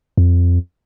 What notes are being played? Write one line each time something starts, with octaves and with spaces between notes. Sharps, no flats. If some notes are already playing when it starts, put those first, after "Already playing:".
F2